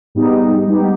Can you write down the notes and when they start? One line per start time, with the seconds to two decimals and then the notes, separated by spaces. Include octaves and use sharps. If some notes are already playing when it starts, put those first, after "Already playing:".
0.15 G#2 G3 B3 D#4 G4
0.66 G#2 G3 B3 D#4 G4